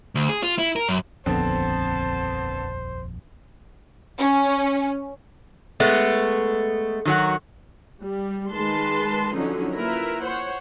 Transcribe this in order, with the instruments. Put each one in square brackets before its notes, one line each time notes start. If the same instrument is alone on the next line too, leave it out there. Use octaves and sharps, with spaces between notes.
[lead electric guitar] D2
G#4
F4
E4
A#4
F#2
[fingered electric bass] D#1 A#1 F2 [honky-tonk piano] D3 B3 C4 [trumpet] C5 [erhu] A5
[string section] C#4
[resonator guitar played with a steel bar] G#3 B3 [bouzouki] A3
[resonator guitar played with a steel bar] D#3 F#3 F#4
[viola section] G3
D#3 G#3 B4 A5 C6
D3 F3 F#3 C#4 D#4
A#3 E4 F4 A#4 B4 E5
C5 C#5 F#5